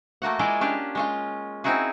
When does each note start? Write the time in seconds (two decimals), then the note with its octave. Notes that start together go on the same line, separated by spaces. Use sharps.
0.22 A3 A#3 F#4 F#5
0.39 G#3 E4 F4 G#4 D5
0.61 C#4 D4 G4 F5
0.95 G#3 C#4 F4
1.64 C4 C#4 D#4 E4 F#4 G#4